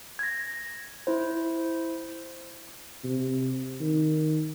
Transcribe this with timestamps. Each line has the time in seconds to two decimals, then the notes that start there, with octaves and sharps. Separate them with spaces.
0.19 G#6 A#6
1.07 E4 C5
3.04 C3
3.80 D#3